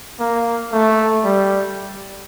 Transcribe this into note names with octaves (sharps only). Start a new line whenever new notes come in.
A#3
A3
G3